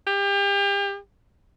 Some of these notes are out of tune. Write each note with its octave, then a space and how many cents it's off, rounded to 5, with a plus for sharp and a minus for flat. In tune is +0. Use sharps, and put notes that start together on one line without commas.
G4 +35